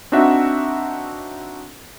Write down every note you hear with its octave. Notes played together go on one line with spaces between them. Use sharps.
C4 D4 D#4 F#4 E5 F#5